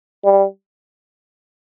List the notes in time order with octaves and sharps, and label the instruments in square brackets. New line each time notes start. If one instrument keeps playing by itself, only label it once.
[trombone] G3